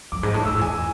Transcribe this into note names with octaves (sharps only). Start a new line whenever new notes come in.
F2 D6
G#2
A2
G#2 E6
F2
E2 G#5